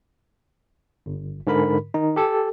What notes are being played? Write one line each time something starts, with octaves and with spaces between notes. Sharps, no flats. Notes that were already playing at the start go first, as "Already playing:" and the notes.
G1
G#2 D3 A#4 B5
D#3 D#4
G4 A4